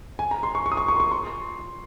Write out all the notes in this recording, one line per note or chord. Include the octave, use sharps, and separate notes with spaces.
G#5
A#5
C6
C#6
C#6
D#6
C#6
C#6
C6
C#6
C6